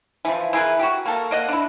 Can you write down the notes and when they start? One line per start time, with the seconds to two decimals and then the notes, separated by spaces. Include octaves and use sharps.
0.25 E3 F3
0.53 E4 G#4 A#4 B4
0.79 F#4 G4
1.06 A#3 A4 A#4
1.31 A#3 D#5 F#5
1.48 D4 E4